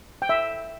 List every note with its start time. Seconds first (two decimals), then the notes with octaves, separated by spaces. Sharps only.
0.22 G5
0.29 E5